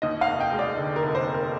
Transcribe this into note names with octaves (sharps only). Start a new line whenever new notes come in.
D#2 D#5
F5
F1
G5
G#3
D5
D3
A#4
F1
C5
F1
A#4